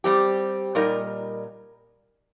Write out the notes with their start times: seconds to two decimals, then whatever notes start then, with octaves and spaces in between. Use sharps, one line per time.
0.04 G3 C4 G4
0.75 A#2 G3 D#4 A#4 D#5